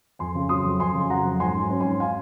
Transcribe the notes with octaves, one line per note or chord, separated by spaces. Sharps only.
F2 G#5 C6
C#3
F#3 C6 D#6
F2
F2 G#5 C6
C#3
F#3 F#5 A#5
F2
G#2 G#5 C6
F#3
C#4
G#5 C6
G#2
F5 G#5